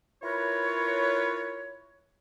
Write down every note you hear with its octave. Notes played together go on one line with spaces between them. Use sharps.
E4 F4 A#4 B4 C#5